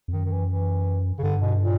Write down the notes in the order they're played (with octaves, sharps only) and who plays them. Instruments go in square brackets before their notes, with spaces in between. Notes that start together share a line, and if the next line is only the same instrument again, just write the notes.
[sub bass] F2
[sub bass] F#2 [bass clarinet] D#3
[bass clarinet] D#3
E3
E3
C#3
[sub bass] G2 [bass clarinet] D3
[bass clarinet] B2
A#2